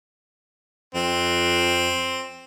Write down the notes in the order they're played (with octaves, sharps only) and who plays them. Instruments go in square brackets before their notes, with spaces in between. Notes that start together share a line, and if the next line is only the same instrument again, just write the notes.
[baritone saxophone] F2 [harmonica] C4